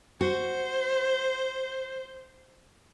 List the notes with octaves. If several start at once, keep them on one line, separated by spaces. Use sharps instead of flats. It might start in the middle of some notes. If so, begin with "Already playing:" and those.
F#4 C5